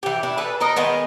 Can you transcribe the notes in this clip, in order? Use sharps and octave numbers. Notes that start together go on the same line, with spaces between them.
E3 G4
D4 E4
G#4 A4 B4
D#4 A#4 D#5
D#3 G#3 B3